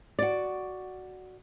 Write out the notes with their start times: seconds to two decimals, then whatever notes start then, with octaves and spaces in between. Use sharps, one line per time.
0.19 F#4 D5